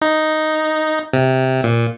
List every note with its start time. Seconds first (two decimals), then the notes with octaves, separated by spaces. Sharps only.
0.02 D#4
1.13 C3
1.64 A#2